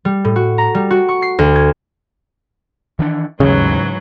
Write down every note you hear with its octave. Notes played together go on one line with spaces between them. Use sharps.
G3
A2
F#4
A#5
G3
F#4
C#6
C7
D2
G#6
D#3 E3 D4
A1 D#2 G#2 C#3 E3 F#3